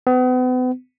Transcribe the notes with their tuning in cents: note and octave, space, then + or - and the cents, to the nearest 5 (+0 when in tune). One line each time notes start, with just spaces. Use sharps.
B3 +40